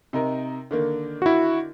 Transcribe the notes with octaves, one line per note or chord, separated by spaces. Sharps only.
C3 D#4 A#4
D3 D#3 A#3
E4 F#4